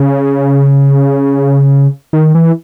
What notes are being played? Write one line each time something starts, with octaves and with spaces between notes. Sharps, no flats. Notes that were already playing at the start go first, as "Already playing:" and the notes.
Already playing: C#3
D#3
E3